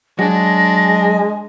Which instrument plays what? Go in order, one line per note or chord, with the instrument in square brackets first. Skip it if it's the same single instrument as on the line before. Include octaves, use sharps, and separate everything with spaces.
[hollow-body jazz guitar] F#3 [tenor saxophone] G#3 [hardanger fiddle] D4 [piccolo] A#6